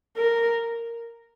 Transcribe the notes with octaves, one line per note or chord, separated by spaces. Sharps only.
A#4